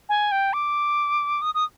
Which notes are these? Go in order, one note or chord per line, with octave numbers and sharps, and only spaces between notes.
G#5
G5
D6
D#6
D#6